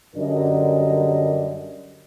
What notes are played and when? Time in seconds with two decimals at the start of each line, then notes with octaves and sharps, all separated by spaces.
0.16 F#2 D3 G3 D4 A#4 D#5